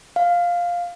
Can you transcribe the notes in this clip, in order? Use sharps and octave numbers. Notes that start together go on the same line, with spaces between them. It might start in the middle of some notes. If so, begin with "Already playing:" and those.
F5